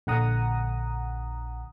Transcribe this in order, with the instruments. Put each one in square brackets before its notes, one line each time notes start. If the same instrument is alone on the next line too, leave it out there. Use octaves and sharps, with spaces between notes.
[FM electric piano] A#1 D3 F#5 A#5 D#6